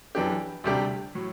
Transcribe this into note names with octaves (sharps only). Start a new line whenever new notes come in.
F#2 E3 B3 D4 G4
D2 C3 G3 D4 G4
A2 F#3